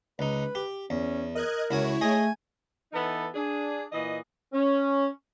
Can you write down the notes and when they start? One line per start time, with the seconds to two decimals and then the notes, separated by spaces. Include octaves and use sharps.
0.19 C#2 D#4 B4
0.55 G4
0.90 E2 C#4
1.35 A#4 D#5 F#6 G#6
1.71 C#2 E4 F#4 C#5 G#5
2.01 A3 G#4 D#5 G#5
2.92 E3 B3 D#4 A4
3.34 D4 G#4
3.92 A#2 E3 D#5
4.53 C#4